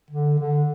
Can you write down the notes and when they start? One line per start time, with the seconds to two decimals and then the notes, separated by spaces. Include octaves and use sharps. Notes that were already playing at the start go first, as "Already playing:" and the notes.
0.11 D3
0.39 D3